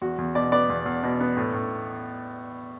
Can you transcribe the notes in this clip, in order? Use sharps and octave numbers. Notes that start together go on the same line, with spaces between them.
E2 F#4
E2
B2 D5
B3 D5
E2
E2
B2
B3
A2
A2